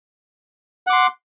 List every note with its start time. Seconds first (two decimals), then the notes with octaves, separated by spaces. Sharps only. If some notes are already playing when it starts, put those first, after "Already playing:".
0.87 F#5
0.90 D6
0.93 C6